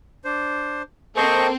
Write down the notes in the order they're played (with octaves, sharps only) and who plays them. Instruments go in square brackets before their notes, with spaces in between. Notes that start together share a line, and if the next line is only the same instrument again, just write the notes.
[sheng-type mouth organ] D4 C5
[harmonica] A#3 A4 [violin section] C4 [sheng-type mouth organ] C5 D#5 C#6